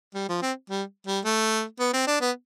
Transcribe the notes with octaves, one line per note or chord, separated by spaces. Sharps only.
G3
F3
C4
G3
G3
A3
B3
C4
D4
B3